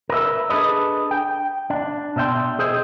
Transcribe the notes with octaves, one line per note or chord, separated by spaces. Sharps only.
A#4 B4 D#5 E5
D4 G#4 A4 B4 D#5
G5
D4
B2 D5 E5 G5 C6
G#4 C5 D#5 E5